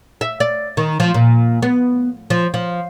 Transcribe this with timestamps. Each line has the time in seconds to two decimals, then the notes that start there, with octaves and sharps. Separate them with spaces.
0.21 E5
0.40 D5
0.77 D#3
1.00 F3
1.14 A#2
1.62 B3
2.30 F3
2.54 F3